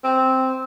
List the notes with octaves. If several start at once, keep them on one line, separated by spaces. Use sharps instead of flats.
C4